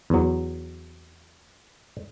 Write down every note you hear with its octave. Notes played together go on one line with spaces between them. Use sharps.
E2 F#3